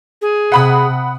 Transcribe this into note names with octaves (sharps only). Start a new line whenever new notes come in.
G#4
C3 F#5 B5 D#6